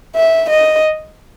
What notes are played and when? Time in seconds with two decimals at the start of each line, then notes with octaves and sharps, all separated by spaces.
0.16 E5
0.50 D#5